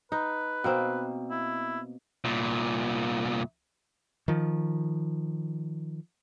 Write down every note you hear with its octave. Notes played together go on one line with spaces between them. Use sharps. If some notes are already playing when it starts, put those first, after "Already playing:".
D#4 B4
B2 A#3 C4
E4
C2 A#2
D#3 F3